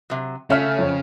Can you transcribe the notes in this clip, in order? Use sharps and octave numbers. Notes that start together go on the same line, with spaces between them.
C3 F#3
C#3 A3 C#4 E5 F5 F6
F2 C#5